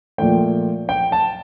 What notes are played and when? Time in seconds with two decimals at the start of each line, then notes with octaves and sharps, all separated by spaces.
0.18 A#2 F3 A3 G5
0.89 G5
1.12 A5